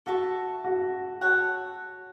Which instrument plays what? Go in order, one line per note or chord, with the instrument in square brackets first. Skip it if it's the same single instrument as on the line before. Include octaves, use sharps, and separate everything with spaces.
[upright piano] F#4 [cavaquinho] A4 E5 A5 C#6
[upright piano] F#4
[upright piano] F#4 [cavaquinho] A4 C#5 F#5